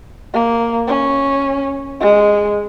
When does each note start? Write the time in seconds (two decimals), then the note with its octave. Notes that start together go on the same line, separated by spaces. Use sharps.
0.34 A#3
0.87 C#4
2.00 G#3